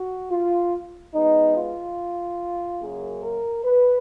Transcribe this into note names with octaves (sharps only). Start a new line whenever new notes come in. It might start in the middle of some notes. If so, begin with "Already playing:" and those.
Already playing: F#4
F4
B2 G#3 B3 D#4
F4
F#2 C#3 F#3 A#3 G#4
A#4
B4